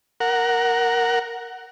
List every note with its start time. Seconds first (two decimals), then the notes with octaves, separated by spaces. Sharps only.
0.20 A#4 F#5